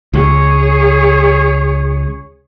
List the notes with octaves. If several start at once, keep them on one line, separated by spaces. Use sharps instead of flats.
C#2 G#4 C#5